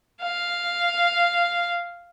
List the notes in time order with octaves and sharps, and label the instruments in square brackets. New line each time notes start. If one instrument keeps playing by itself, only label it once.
[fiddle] F5